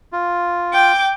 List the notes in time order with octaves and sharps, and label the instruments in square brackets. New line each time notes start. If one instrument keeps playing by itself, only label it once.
[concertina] F4
[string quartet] G5 D6